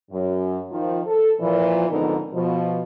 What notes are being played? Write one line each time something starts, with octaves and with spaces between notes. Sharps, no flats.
F#2
D#3 F3
A4
A#2 E3 F3
F2 G#2 D3 B3 D#4 A#4
B2 F3